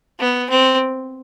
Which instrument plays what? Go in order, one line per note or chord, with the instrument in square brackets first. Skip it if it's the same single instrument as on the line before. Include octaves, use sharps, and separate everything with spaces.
[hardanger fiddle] B3
C4